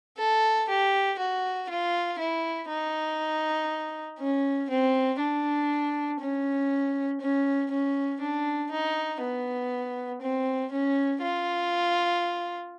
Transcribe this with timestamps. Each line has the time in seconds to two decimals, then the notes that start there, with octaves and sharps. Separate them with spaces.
0.18 A4
0.68 G4
1.19 F#4
1.69 F4
2.19 E4
2.70 D#4
4.19 C#4
4.70 C4
5.20 D4
6.20 C#4
7.21 C#4
7.71 C#4
8.21 D4
8.71 D#4
9.21 B3
10.22 C4
10.71 C#4
11.22 F4